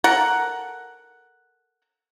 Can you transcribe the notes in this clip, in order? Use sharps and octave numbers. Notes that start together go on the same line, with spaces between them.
A4 A#4 F#5